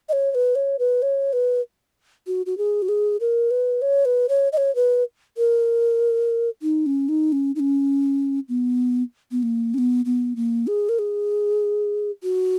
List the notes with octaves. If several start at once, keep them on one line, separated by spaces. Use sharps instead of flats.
D#5
C#5
C#5
B4
C#5
B4
C#5
B4
F#4
F#4
G#4
F#4
G#4
A#4
B4
C#5
B4
C#5
D#5
C#5
B4
A#4
D#4
C#4
D#4
C#4
D#4
C#4
B3
B3
A#3
C#4
B3
B3
A#3
G#4
A#4
G#4
F#4